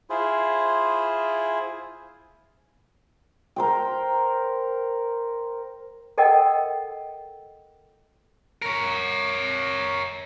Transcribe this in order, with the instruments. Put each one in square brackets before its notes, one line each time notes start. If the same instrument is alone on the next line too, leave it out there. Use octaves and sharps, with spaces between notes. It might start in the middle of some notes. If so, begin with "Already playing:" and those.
[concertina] E4 F4 G#4 C5
[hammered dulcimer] A#4 C5 G5
[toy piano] A4 A#4 D#5 F#5 G5
[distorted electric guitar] A#4 C#5